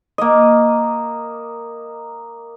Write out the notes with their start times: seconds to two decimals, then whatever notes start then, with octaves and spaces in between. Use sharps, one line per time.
0.18 A#3 D#5